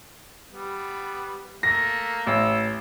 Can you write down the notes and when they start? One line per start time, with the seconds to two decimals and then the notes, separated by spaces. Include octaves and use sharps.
0.51 G3 B3
1.63 A3 A#3 A#6
2.27 A1 E6